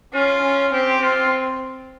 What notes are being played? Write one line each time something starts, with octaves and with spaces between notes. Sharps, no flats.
C#4 F4
C#4
C4 G4
C4 F4